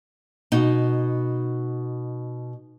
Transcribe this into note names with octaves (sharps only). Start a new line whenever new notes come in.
B2 D#4